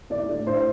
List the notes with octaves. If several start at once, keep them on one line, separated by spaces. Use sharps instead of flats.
A2 D5
A3 D4
A2 C5